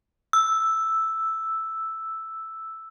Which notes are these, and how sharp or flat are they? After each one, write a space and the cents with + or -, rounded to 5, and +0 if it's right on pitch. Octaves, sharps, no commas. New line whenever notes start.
E6 +0